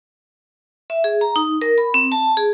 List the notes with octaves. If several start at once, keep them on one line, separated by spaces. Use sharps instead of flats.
E5
G#4
A#5
D#4
A#4
B5
C4
A5
G#4